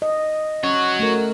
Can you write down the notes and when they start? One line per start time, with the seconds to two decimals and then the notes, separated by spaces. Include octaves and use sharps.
0.02 D#5
0.63 C#4 F#4 C#5
0.99 A3 A#4